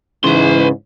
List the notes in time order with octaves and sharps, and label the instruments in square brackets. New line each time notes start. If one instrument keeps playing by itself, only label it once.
[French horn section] G#2 E3 [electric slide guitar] C#3 [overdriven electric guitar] B4 C6